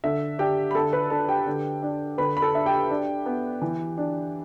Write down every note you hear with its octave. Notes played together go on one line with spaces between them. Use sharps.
D3 E5
D4 G4 G5
B5
D3 A4 A5
B4 B5
D4 A4 A5
G4 G5
D3
D4
D3 B4 B5
B5
A4 A5
D4 E5
G4 G5
D4
B3
E3
D4